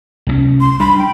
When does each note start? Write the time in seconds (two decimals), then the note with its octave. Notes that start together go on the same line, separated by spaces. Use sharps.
0.27 C2 F#3 C#4
0.61 C6
0.80 G3 D4 B5
0.99 G5